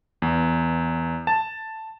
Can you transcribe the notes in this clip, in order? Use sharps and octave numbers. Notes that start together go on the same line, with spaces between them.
E2
A5